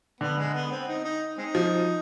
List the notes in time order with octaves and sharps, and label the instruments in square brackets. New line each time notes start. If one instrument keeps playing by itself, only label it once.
[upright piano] D3 [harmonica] B3
[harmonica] G#3
B3
C4
D#4
D#4
G#3 C4 D#4
[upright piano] F3